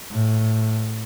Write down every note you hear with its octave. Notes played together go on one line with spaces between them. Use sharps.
A2